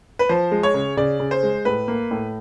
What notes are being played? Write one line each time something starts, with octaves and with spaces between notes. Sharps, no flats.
B4
F3 C5
G#3
C#5
C#3
C#3 D5
C#3
C5
G#3
A2 B4
A#3
A2